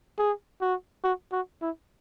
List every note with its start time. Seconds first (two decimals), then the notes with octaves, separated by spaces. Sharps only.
0.19 G#4
0.61 F#4
1.04 F#4
1.32 F#4
1.61 E4